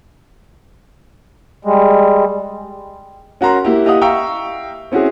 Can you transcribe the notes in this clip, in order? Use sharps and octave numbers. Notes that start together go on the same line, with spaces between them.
G3 G#3
C#4 F#4 A#4 A#5 C6
A#3 E4 G4
E4 G4 D#5 F5 F#5 D#6
E5 F5 G5 A#5 C#6 E6
C4 C#4 E4 F#4 G#4